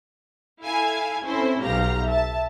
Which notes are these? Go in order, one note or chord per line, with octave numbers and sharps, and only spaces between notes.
E4 A4 F5 G#5
C4 C#4 E4 A4 C5
B1 B2 G4 F5 A#5
E5 A5